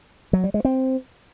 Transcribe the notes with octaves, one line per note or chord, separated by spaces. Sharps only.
F#3
G3
G#3
C4